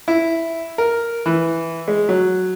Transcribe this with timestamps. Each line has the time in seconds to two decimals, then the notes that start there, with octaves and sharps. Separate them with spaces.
0.08 E4
0.78 A#4
1.26 E3
1.88 G#3
2.09 F#3